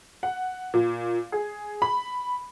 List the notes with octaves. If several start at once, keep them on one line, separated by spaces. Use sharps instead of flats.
F#5
A#2
G#4
B5